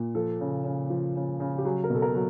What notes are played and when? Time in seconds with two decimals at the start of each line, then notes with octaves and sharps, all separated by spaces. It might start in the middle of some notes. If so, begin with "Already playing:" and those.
Already playing: A#2
0.15 F3 A4
0.40 C#3
0.64 C#3
0.90 F3
1.15 C#3
1.40 C#3
1.58 G4
1.65 F#3 G#4
1.84 A#4
1.90 B2
1.95 A4
2.02 A#4
2.15 F#3